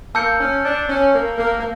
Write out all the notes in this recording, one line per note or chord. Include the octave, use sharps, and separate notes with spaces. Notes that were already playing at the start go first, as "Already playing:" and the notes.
A#3 A5 E6 G6 C#7
C#4
D4
C#4
A#3
A#3
A#3